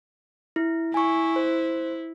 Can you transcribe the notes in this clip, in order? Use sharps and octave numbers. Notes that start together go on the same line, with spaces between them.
E4
E4 G#5 C#6
C5